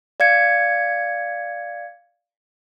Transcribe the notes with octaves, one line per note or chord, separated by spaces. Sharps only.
D5 F5 G#6 C#7